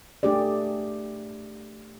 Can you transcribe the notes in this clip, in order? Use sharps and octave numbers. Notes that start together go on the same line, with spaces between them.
A3 D4 G4 G#4 D5